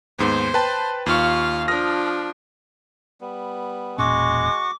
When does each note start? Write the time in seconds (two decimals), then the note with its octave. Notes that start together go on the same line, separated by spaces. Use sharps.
0.19 D#2 G#2 B3 C5
0.54 B4 G5 A5
1.06 D#2 F4 F5 C#6
1.68 F3 D4 D#6 F6 A#6
3.21 G3 B3
3.98 E1 A#2 G#3 C#4 F#4 C#6 D6